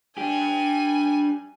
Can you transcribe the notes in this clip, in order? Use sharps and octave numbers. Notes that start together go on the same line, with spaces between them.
D4 G4 G#5